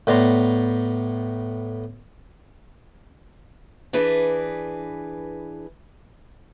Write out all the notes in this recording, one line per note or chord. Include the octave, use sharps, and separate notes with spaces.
A2 B3 D5 A#5 C6
E3 D4 G#4 B4